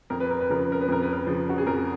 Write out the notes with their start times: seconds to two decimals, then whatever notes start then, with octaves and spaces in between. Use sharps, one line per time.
0.10 F2 A#4
0.20 B4
0.31 A#4
0.41 B4
0.49 C#3 F3 A#4
0.61 B4
0.72 A#4
0.81 B4
0.88 F2 A#4
1.02 B4
1.13 A#4
1.27 C#3 F3
1.49 F#4
1.58 G#4
1.66 F2 A#4